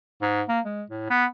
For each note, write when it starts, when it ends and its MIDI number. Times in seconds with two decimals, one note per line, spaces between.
0.22 0.42 44
0.49 0.60 58
0.65 0.83 56
0.90 1.07 45
1.10 1.25 59